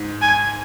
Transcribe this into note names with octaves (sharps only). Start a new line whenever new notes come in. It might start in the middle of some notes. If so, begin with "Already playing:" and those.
Already playing: G#2
G#5